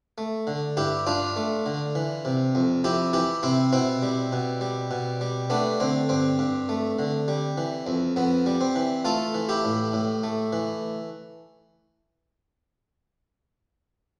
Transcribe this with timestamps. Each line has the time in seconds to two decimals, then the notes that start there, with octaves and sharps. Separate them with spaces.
0.18 A3
0.47 D3
0.77 G2 E4 G4
1.07 G2 D4 F4
1.36 A3
1.66 D3
1.95 E3
2.25 C3
2.55 F2
2.84 F2 E4 G4
3.13 E3 E4 G4
3.43 C3 C4 E4
3.73 B2 C4 E4
4.03 G3
4.32 B2
4.61 G3
4.91 B2
5.21 G3
5.50 A3 B3 D4
5.80 D3 C4
6.09 G2 C4
6.39 G2
6.69 A3
6.99 D3
7.28 G3
7.58 E3
7.87 F2
8.16 F2 B3
8.46 G3
8.61 C4
8.76 E3
9.05 A3 F4 A4
9.34 E3
9.49 E4 G4
9.65 A2
9.93 A2
10.23 A3
10.53 E3